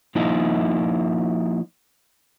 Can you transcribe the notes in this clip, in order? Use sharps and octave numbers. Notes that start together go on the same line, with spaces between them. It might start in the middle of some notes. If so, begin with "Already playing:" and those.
F3 A#3 D#4 E4